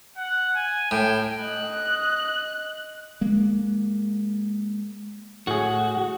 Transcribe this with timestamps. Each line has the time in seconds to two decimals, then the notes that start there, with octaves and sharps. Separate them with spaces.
0.17 F#5
0.56 G#5
0.91 A2 G5
1.42 D#5 F#6
3.21 G#3 A#3
5.47 A2 F#4 G#4